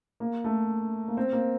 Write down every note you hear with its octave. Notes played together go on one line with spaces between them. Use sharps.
A#3
A3
A#3
C4
A#3